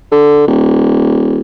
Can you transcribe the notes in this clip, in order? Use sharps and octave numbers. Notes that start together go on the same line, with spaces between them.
D3
D#1